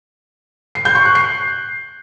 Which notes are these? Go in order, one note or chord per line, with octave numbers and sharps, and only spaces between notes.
C7
G6
C#6
F#6
C7